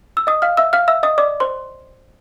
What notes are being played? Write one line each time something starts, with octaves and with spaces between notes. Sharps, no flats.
E6
D#5 D#6
F5 F6
E5 E6
F5 F6
E5 E6
D#5 D#6
D5 D6
C5 C6